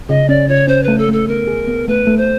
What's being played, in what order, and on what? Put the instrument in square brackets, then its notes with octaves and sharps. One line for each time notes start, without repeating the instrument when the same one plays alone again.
[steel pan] C#3 [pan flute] D#5
[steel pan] C#4 [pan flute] D5
[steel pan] C#3 [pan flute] C#5
[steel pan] C#4 [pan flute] C5
[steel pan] A3 [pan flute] B4
[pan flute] A4
[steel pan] A3 [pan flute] A4
[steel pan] B3 [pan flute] A#4
[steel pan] G#4
B3
[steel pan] A3 [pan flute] B4
[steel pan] A3
[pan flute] C5